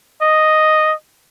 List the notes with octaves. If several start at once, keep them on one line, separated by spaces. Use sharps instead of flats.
D#5